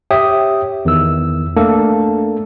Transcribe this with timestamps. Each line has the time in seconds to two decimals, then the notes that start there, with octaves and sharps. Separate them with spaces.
0.11 G4 C#5 E5 G5 D#6
0.85 E2 D#3 E6
1.57 A3 A#3 D4 A4